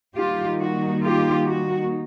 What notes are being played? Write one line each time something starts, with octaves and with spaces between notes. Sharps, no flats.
D#3 G3 A#3 D#4 F4 G4
F#4
F4 G4
F#4